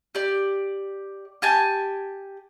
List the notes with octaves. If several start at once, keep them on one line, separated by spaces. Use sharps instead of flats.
G4 D5
G4 G#5 A5